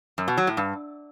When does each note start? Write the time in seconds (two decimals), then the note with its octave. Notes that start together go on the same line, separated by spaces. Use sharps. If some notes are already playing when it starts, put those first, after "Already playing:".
0.18 F#2
0.28 B2
0.37 F#3
0.47 A2
0.57 G2